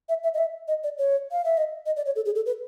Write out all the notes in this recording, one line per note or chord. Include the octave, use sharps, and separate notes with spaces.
E5
E5
D#5
E5
D#5
D5
C#5
F5
E5
D#5
D#5
D5
C#5
A4
G#4
A4
B4